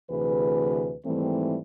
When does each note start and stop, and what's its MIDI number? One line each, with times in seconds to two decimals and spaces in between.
0.11 0.94 38
0.11 0.94 48
0.11 0.94 52
0.11 0.94 68
0.11 0.94 71
1.06 1.58 44
1.06 1.58 51
1.06 1.58 52
1.06 1.58 55
1.06 1.58 57
1.06 1.58 60